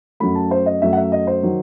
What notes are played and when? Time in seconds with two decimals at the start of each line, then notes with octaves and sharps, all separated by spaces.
0.20 F#2 F#3 A3 B5
0.35 A5
0.51 C5
0.66 D#5
0.82 F#2 F#3 A3 E5
0.93 F#5
0.97 E5
1.12 D#5
1.27 C5
1.43 D#3 F#3